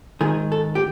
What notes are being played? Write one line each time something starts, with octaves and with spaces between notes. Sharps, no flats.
G#2 D#3 G#4
A4
G4